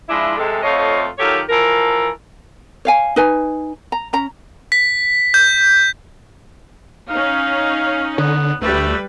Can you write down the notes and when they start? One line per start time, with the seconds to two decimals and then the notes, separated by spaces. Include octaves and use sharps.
0.09 F3 G#3 D4 E4
0.37 C3 G#3 A4
0.63 F2 F3 A3 F4 C#5 D#5
1.19 D#3 F#3 F4 G4 A4 C#5
1.49 E3 F3 A4 A#4
2.85 C#5 F5 G#5
3.16 D#4 B4 G#5
3.92 A#5
4.13 C#4 A#5
4.72 B6
5.34 G6
7.10 C#4 D#4 F5
8.18 D3 B3
8.61 D2 G3 A3 B4